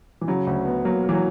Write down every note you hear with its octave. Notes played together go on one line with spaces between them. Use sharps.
E3
C#3 F#3
D2
B3
F#3 A#3
A#3
E3
F#3